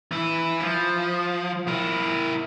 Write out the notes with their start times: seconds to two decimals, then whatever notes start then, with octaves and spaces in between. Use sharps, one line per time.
0.12 E3 E4
0.61 F3
1.68 E4 A#4